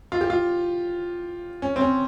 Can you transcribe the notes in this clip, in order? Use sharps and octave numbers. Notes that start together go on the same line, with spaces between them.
F4
G4
F4
C#4
C4
C#4